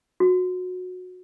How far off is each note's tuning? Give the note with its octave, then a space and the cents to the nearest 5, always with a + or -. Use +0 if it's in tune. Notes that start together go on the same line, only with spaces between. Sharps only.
F#4 -20